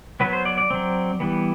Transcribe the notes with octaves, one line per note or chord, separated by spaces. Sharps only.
F#3 B3 B4
C5
D5
D5
F#3 C4
E3 G3 B3